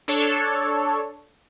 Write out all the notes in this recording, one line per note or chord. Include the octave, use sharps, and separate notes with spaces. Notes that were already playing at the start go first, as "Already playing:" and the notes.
D4 A4 C#5